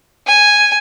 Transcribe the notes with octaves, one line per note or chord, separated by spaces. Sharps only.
G#5